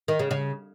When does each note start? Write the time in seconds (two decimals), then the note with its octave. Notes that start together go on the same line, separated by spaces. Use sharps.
0.08 D#3
0.19 C#3
0.31 C#3